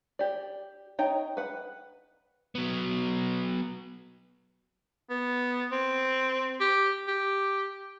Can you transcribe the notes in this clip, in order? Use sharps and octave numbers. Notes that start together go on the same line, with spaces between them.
G4 D5
D#4 C#5 D#5 G5 A#5
B4 F#5
F#3 B3
B3
C4
G4
G4